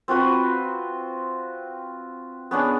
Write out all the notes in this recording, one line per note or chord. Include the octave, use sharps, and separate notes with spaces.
C4 F4 F#4 B4
B3 C#4 D4 G#4